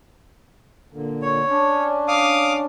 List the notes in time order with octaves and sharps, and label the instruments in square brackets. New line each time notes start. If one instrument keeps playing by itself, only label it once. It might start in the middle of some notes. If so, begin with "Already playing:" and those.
[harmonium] A#2 D3
[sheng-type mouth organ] C#5
[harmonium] C#4 D4
[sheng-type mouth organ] F5 D6 D#6